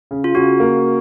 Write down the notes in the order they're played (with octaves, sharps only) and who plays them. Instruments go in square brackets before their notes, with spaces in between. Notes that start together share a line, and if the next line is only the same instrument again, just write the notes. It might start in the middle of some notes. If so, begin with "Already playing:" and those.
[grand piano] C#3
[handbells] F4
[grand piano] C#3 [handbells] F#4
[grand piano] A#3